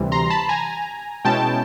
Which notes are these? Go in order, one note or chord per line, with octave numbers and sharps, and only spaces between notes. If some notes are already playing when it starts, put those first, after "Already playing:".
Already playing: D2 C3 E3 G3 C4
A#5 C6
A5 B5
G#5 A#5
B2 G#3 C#4 E4 G5 A5